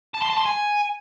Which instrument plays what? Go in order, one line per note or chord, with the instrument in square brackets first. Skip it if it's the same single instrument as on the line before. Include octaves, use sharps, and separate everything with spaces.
[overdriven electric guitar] A5
C6
A5
C6
G#5